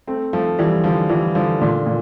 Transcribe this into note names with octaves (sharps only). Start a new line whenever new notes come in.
A3 C4
F3 A3
E3 G3
D3 F3
E3 G3
D3 F3
A#2 D3
A#2